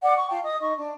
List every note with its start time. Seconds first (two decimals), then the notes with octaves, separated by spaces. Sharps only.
0.03 D5 F#5 D6
0.16 C#6
0.30 F4 F5 G5 A5
0.43 D#5 D#6
0.60 D#4 D#5 C#6
0.76 D4